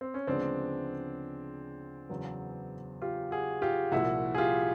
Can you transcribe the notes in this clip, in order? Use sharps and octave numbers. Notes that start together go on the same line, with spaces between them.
C4
C#4
D2 C#3 F3 G#3 B3 C4 D4
E2 C#3 F#3 B3
F4 G4
F#4 G#4
F4 G4
C2 A#2 F3 E4 F#4
G#4
F4 G4